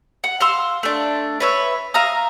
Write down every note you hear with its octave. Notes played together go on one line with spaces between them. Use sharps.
F#5
F5 C6 E6
A3 D4
B4 C#5 E5
E5 F5 A#5 D#6